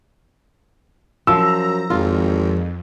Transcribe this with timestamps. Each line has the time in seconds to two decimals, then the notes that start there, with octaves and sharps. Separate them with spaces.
1.27 F#2 F3 C5 A#5 E6
1.90 G#1 F2 F4